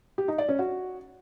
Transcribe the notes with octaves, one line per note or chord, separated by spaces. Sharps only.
G4
D#4
D5
C#4
F#4